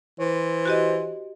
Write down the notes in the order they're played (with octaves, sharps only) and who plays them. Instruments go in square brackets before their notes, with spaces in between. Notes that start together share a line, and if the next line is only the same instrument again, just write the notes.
[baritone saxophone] E3 [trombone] C5
[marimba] F#4 G4 D#5